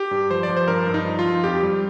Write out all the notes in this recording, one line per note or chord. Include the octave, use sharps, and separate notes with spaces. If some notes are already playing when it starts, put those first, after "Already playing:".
Already playing: G4
G2
F3 C5
D5
F3
C5
G2 A#4
G2
D#4
F3
F4
F3
F2 G4
G3